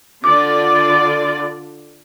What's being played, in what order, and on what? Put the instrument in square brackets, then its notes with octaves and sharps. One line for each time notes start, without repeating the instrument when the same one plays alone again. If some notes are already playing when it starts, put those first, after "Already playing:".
[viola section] D3 F4 D5 [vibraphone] D6